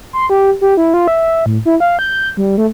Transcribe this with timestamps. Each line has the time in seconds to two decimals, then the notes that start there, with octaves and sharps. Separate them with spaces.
0.13 C6
0.30 G4
0.61 G4
0.77 E4
0.94 F4
1.08 E5
1.46 A2
1.66 E4
1.80 F5
1.99 G6
2.37 G3
2.58 A3